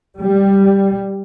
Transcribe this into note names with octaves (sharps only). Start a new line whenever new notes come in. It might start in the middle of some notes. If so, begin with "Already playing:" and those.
G3